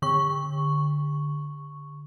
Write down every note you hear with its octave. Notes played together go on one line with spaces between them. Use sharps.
D3 C#6